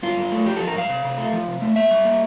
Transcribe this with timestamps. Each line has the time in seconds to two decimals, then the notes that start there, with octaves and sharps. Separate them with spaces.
0.03 G2 F4
0.17 G2
0.32 A3
0.45 F3 G4
0.57 F3 A4
0.67 A#4
0.75 G2 F5
0.89 C3
1.04 C3
1.18 A3
1.33 F3
1.48 C3
1.62 A3
1.76 A#3 E5
1.91 G3
2.05 A#3